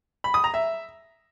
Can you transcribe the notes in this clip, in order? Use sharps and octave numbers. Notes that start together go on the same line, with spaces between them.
B5
D#6
A#5
E5